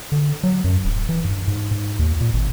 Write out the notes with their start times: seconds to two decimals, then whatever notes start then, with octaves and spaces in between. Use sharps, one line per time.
0.12 D3
0.43 F#3
0.64 F#2
0.84 D1
1.09 E3
1.24 G2
1.48 G#2
1.71 G#2
1.99 D#2
2.21 A#2
2.33 G#1